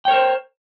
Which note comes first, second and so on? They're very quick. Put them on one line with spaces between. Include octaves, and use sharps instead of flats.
G5 C#5 A#4 C5